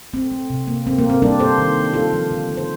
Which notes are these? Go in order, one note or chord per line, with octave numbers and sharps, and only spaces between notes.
A3 C4
A3
C3
A#3
A3 C4
A#3
A3
C4
G3 A#3 D4
A#3 A4 C5
D#3
D#3
A#3 F4 A4
F3
D3
A3
C5